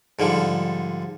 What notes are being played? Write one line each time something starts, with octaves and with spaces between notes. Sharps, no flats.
G#2 D3 F3 G3